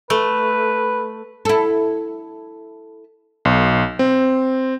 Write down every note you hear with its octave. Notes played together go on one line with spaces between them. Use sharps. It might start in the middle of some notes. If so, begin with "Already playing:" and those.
A3 B4
E4 A4
B1
C4